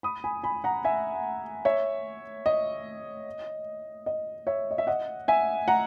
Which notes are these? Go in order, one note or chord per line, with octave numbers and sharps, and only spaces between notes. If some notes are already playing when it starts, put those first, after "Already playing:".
B5 D#6
G#5 B5
G#5 B5
F#5 A#5
E5 G#5
C#5 E5
D#5
D#5
C#5 E5
D#5
E5
D#5 F#5
E5 G#5
F#5 A#5